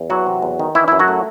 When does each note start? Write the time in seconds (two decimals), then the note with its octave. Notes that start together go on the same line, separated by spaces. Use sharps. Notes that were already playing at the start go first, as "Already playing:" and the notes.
Already playing: E2
0.10 E3 F#3 F#4
0.27 C3
0.42 E2
0.60 D#3
0.75 E3 E4
0.88 F#2 E4
0.99 F#3 F#4
1.08 A3